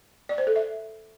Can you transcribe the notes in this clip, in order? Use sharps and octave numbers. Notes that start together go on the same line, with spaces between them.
D5
C5
A4
E5